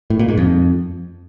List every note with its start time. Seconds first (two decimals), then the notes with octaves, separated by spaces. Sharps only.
0.10 A2
0.19 A#2
0.28 G#2
0.38 F2